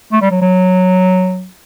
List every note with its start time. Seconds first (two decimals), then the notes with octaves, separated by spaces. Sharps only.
0.12 A3
0.21 G3
0.31 F#3
0.41 F#3